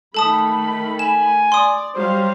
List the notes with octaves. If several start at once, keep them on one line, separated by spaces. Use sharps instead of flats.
D#3 A3 A4 A5 B5 D#6
G#5 E7
D5 C6 D#6
F#3 G3 C5 F5